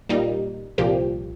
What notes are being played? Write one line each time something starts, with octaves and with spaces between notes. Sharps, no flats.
A#2 G3 A#3 D#4
C2 A#2 F3 A#3 G4